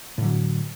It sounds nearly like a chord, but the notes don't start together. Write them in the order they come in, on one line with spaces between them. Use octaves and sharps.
A2 D3 F#3